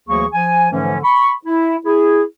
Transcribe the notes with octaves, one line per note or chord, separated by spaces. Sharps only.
D2 E3 F#3 A#3 G#4 C#6
F3 G#5
G#2 D3 E3 F3 A3 C#4
B5 C#6
E4
E4 G#4